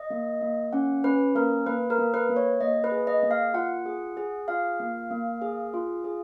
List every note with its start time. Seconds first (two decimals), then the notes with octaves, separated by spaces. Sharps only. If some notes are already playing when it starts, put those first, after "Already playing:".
Already playing: D#5
0.10 A#3
0.41 A#3
0.73 C#4 F#5
1.04 C#4 B4
1.35 A#3 A#4
1.66 A#3 B4
1.90 A#4
1.98 A#3
2.14 B4
2.29 A#3
2.36 C#5
2.60 A#3 D#5
2.84 B4
2.91 G#4
3.07 D#5
3.23 A#3
3.31 F5
3.54 F4 F#5
3.86 G#4
4.17 G#4
4.48 F4 F5
4.80 A#3
5.11 A#3
5.42 G#4
5.74 F4
6.04 G#4